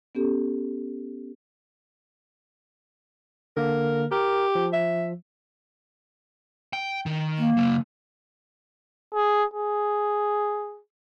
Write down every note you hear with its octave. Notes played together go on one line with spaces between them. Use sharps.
B3 C#4 G4 A4
D3 A#3 A#4
G4 A#4
F3
E5
G5
D#3
A#3
C#3 F#3
G#4
G#4